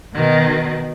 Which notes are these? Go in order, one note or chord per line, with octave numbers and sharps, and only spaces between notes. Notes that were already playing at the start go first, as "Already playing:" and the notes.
B2 D#3